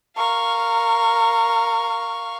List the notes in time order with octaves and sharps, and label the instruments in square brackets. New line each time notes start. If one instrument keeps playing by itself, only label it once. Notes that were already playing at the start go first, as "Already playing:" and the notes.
[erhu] A#4 [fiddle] F5 C#6